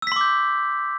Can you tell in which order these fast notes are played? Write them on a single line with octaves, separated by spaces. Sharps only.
E6 B6 C6 D6 G6